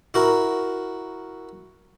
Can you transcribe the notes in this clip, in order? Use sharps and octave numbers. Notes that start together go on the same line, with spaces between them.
E4 F#4 A#4